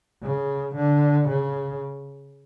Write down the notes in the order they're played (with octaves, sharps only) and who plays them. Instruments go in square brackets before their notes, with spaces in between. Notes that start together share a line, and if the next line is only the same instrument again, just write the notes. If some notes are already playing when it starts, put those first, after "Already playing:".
[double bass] C#3
D3
C#3